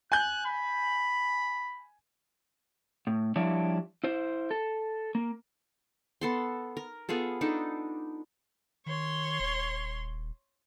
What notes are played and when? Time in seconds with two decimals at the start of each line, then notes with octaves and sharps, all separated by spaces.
0.12 G#5 F#6 G6
0.46 B5
3.07 A2
3.36 F3 G3 D4 E4 G4 C#5
4.04 E4 C5
4.51 A4
5.15 A#3
6.21 B3 A4 C6
6.77 A#4
7.09 B3 F4 G#4 A4
7.41 D4 D#4 A4
8.86 D#3 C#5 C6
9.40 D#1